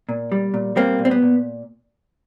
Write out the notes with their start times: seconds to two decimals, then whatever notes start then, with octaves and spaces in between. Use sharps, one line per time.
0.09 A#2
0.32 G3
0.54 A#2
0.76 G3 A#3 C4
0.99 A#2
1.05 C4
1.11 B3
1.22 A#2